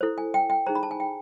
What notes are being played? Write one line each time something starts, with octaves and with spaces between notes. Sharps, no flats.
E4 A4 C5
G#5
G5
G5
D#4 G#4 C5 A#5
B5
A5
G#5
G5